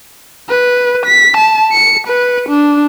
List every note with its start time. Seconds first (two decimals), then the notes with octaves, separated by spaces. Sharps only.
0.50 B4
1.06 B6
1.37 A5
1.73 C#7
2.07 B4
2.49 D4